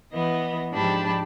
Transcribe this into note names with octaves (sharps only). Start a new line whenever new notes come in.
E3 B3 D#5
G#2 F3 D4 G4 A5 B5